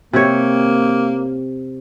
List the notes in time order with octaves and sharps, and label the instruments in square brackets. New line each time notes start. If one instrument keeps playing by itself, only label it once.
[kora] C3 G4 C#5 [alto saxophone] A#3